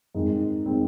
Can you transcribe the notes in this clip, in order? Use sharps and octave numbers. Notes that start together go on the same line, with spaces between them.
G#2 D#3 G#3 C4
D#3 G#3 C4